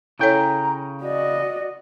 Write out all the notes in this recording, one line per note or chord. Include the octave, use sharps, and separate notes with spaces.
C#3 C#4 E4 A4 C#5 G5 A#5
F#4 D5 D#5